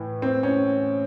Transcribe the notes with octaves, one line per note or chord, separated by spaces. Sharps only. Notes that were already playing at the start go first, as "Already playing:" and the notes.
Already playing: A2 E3
C4
C#4